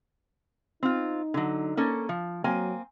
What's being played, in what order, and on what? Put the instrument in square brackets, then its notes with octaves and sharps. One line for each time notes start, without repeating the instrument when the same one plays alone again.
[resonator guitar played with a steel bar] C4 F4 [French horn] D#4
[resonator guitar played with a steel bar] D3 F#3
A#3 C#4 A4
F3
[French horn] F#3 [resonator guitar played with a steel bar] A#3 C4 G#5